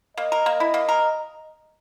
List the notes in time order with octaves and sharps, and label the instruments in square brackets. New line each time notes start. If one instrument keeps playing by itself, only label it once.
[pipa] A#3 [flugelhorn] D#5
[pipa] A#4
A#3
E4
A#3
A#4